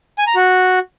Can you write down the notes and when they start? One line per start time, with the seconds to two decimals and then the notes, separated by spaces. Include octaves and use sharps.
0.18 G#5
0.27 A#5
0.36 F#4